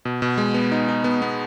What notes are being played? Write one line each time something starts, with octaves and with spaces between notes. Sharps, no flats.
B2
B2
G#3
B3
D#4
D#4
B3
B3